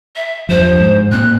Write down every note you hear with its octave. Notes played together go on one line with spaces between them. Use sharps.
E5
E2 G2 F3 C5
G#2 G#3
A2 A#3 C4 F#6